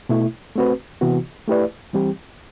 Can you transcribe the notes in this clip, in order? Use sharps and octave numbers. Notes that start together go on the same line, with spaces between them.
B2 A3 E4
A3 C4 F#4 B4
C3 E3 B3 F#4
A3 E4 G4 B4 D5
E3 G3 C4 G4